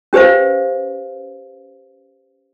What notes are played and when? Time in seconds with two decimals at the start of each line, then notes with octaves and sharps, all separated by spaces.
0.13 C#4 G4 B4 C5 F5